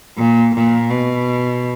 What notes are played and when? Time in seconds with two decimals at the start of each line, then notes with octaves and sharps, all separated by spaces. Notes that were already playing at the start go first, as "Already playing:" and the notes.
0.17 A#2
0.55 A#2
0.90 B2